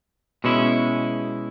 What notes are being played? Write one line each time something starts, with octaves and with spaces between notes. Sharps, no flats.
B2 G#3 C#4 E4